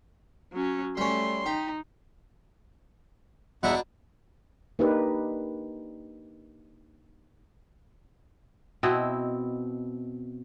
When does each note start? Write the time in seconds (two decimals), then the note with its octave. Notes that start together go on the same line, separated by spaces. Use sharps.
0.53 F#3 C#4
0.97 G3 A3 C#4 C6
1.46 D#4 G4
3.63 E2 B2 D4 E5 F#5 A#5
4.79 A#3 D4 D#4 G4 B4
8.83 B2 C4 E4 D#5